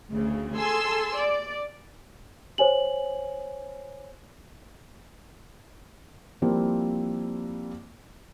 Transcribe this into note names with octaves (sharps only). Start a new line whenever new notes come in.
D2 C#3
G#4 A4 G#5 C6 E6
D5
C5 C#5 G#5 F#7
F3 G3 A#3 C4 E4